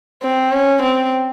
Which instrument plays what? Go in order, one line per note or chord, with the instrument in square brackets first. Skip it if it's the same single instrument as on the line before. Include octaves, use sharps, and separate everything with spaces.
[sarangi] C4
C#4
C4